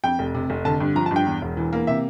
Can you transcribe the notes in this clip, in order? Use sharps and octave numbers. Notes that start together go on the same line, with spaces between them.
F2 G5
F1
C3
F1
D3 A5
G2
F3 A#5
A5
G2 G5
E2
E1
E3
A#3
C3 E5